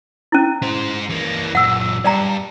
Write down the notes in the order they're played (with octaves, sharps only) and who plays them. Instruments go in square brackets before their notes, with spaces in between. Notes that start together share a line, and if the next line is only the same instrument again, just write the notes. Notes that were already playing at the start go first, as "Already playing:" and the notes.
[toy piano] C#4 E4
[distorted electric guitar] G#3 C5
E3 A#3
[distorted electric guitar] F#2 A#2 [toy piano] F#5 E6
[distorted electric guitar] G2 [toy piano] D5 G5 A#5